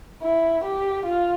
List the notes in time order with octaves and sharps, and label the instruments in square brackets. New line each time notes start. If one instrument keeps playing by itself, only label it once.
[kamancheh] E4
G4
F4